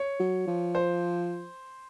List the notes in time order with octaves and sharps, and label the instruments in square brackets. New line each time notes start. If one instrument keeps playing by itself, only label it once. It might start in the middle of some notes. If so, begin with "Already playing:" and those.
Already playing: [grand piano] C#5
[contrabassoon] F#3
F3
[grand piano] C5